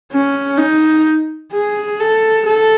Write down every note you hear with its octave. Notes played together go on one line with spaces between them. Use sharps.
C#4
D#4
G#4
A4
A4